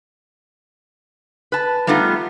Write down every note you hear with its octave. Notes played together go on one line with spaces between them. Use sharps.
B4 A5
G3 A3 B3 D#4 F4